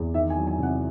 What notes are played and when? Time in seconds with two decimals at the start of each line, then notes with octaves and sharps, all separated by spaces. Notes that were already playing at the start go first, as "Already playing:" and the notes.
Already playing: E2
0.14 D#3 E5
0.30 G#5
0.37 F#3
0.47 G#5
0.58 C3
0.63 F#5